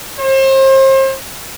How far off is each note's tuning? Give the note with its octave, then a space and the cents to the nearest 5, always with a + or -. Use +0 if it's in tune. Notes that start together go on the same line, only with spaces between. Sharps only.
C5 +35